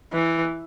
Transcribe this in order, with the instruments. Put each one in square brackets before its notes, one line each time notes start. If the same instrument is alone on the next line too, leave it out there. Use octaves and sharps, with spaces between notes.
[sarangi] E3